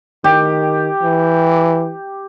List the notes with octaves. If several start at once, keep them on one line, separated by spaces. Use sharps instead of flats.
D#3 G4
E3